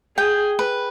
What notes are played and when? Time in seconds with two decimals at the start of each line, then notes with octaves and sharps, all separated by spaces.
0.17 G#4 G5
0.59 B4